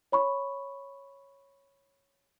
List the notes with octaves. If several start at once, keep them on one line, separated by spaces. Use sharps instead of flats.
C#5 B5 C#6